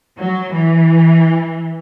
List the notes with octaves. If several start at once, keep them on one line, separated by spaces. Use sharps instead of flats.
F#3
E3